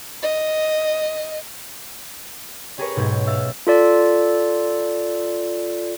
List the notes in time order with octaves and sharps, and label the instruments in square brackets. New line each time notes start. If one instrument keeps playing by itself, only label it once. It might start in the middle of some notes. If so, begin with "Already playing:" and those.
[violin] D#5
[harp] C#4 G4 G#4 A#4 B4 C#5
B1 G#2 B2 G6
E5 F5 E6 F6 A6
[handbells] F4 A4 D5